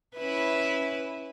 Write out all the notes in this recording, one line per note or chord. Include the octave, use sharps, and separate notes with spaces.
C#4 E4 B4